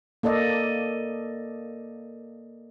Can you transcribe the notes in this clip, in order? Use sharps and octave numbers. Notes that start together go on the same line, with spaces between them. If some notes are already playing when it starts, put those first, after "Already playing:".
A#3 A4 D5 D#5